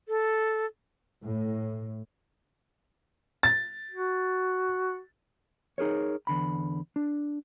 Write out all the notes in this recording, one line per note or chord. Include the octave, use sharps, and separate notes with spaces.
A4
A2
A6
F#4
D#4 G#4 A#4 C#5
E2 D3 B5
D4